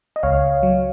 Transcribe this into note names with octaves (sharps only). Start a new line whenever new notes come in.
D#5
C#2 C#5 F5
F#3